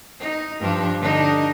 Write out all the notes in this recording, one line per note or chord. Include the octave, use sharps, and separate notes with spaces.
D#4
G2 F3 D4
D3 D4 D#4